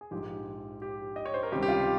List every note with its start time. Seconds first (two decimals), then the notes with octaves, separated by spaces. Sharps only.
0.01 G#4
0.11 A#1 G#2 F3 G4
0.82 G4
1.16 D#5
1.26 C#5
1.34 C5
1.43 A#4
1.52 C#2 C3 D#3 G3 G4
1.62 G4
1.68 F4